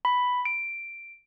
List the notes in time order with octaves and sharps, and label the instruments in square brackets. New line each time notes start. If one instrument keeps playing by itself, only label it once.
[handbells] B5
D7